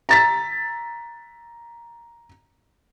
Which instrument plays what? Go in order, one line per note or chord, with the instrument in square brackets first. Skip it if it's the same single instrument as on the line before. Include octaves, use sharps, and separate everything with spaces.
[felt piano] A#5 A6 B6